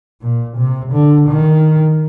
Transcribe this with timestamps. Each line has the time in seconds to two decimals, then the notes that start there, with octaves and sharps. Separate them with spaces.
0.22 A#2
0.57 C3
0.93 D3
1.29 D#3